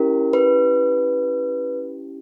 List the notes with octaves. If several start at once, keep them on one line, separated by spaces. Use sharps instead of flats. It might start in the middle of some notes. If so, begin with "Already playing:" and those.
Already playing: C#4 E4 G4 A#4
B4